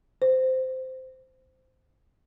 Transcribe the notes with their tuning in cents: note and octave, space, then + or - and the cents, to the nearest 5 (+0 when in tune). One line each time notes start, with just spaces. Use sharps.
C5 -15